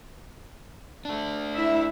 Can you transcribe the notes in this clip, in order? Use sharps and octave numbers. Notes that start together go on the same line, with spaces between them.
A3 D4
E4 E5